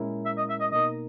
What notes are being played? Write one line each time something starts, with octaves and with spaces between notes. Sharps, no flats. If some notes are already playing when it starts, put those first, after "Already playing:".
Already playing: A#2 G#3 C#4 E4 A#4
E5
D#5
E5
D#5
B2 A#3 D#4 A#4 D#5